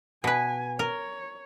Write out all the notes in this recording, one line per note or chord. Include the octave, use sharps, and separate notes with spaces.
B2 B4 G#5
A#4 C#5